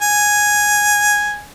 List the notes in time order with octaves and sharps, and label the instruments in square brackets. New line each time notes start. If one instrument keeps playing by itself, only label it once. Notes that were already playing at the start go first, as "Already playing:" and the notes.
[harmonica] G#5